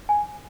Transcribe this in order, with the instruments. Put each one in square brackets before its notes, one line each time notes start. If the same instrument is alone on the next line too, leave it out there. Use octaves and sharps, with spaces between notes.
[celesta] G#5